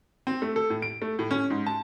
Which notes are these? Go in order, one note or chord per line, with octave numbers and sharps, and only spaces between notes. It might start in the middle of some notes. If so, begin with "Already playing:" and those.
C4
A3
A4
A2
D7
A3
A2
C#4
G#2
A5